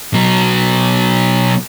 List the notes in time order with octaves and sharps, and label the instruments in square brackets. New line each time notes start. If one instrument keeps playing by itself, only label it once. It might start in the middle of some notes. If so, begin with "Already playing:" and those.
[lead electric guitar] B2 F#3